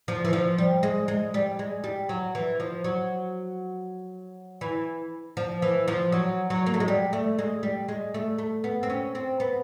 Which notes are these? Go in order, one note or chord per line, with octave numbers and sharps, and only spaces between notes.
F3
E3
F3
G3
G#3
G#3
G3
G#3
G3
F#3
E3
F3
F#3
E3
F3
E3
F3
F#3
F#3
A#3
A3
G#3
G3
A3
G#3
G3
G#3
A3
A3
B3
C4
C#4
C4
B3